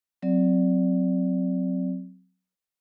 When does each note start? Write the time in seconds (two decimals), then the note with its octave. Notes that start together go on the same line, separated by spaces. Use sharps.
0.22 F#3 C4 D5